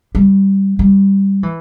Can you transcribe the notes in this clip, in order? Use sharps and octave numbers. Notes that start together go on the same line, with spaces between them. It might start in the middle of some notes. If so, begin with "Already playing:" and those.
G3
G3
E3